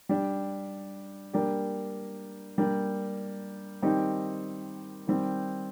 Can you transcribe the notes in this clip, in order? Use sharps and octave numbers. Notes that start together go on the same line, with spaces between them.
G3 D4 G4
G3 A#3 D4 G4
G3 A#3 D4
D#3 G3 C4 D#4 G4
D#3 G3 C4